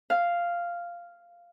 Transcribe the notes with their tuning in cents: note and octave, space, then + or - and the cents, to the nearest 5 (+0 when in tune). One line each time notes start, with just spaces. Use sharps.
F5 -5